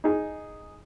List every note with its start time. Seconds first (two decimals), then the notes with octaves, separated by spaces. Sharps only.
0.04 D#4 G#4